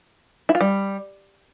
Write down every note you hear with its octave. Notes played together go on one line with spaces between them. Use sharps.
E4
F4
G3